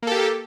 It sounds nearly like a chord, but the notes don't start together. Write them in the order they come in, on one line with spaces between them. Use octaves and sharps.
A#3 A4 G4